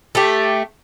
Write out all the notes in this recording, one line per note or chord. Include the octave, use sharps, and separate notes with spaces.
A3 G4